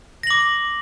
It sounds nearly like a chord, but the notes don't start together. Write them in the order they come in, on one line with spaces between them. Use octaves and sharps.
A#6 F#7 D6